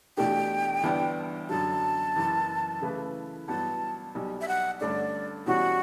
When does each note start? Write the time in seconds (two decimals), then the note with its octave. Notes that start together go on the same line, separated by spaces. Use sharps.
0.17 E2 B2 A3 D4 G4 G5
0.84 G1 G2 E3 B3 D4
1.49 F#2 D3 F#3 A5
2.16 F#1 F#2 E3
2.81 C#3 E3 A3 E4 B4
3.48 A1 G2 F#3 B3 A5
4.15 B1 B2 G3
4.41 E5
4.48 F#5
4.80 G2 D3 A3 C#4 D5
5.46 E2 B2 G3 C#4 F#4